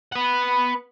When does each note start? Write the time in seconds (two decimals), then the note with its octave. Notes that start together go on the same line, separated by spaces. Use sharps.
0.12 B4 F#5